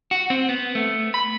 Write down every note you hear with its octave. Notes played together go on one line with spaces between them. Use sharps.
F#4
C4
B3
A3
B5